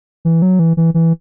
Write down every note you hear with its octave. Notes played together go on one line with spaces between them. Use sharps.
E3
F#3
E3
E3
E3